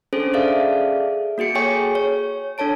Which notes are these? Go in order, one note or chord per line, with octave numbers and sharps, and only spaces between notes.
C#4 D4 G#4 A4 C5
G#4 A4 D5 E5 F5
A#3 F#4 G#4 C#7
G#4 A4 C#5 G5 G#5 C#6
C#5
D4 A4 C#5 A5 D7